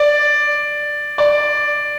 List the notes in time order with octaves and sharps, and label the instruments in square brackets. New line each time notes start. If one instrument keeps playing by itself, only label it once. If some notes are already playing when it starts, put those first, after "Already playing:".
Already playing: [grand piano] D5
D5